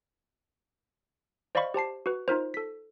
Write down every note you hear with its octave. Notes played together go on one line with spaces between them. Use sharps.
C5 D5 D#5 F5 B5 C#6
G4 C5 A5 C7
F#4 B4
D#4 F4 A#4 C5
A4 B6